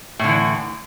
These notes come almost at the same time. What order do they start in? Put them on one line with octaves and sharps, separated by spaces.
A2 D3 E3